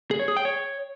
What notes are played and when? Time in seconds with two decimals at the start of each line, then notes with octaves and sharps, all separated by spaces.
0.11 G#4
0.19 C#5
0.28 G#4
0.37 G5
0.45 C#5